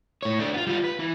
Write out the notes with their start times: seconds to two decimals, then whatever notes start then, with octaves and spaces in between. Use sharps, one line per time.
0.23 A2 C#5
0.39 A3 D4
0.53 B3 F4
0.67 G3 F4
0.84 B4
1.00 E3